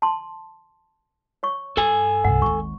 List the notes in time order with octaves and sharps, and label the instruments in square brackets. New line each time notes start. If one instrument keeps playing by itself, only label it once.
[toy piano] A5 C6
C#5 C#6
[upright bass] G2 [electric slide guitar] A4 G#5
[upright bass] C2 G2 [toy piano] F#5
[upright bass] G#1 D#2 [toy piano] C#6